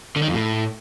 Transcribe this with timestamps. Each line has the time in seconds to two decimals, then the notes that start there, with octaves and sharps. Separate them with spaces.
0.16 D3
0.22 D#3
0.28 F2
0.34 A2